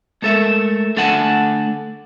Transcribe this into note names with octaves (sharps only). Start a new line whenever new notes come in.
G#3 A3 A4 A#4 E5
D3 A3 A4 F#5 G#5 A5